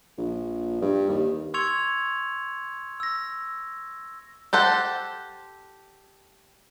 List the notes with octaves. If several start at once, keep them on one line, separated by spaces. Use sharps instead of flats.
A#1
G2
D#2
C6 C#6 E6 G#6 C#7 F7
E6 A#6
G4 A4 C5 F#5